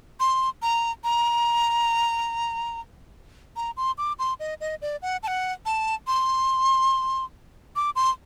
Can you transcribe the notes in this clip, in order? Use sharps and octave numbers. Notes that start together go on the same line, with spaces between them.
C6
A#5
A#5
A#5
C6
D6
C6
D#5
D#5
D5
F#5
A5
F#5
A5
C6
D6
C6